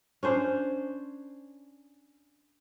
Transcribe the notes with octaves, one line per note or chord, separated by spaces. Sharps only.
C#4 D4 C5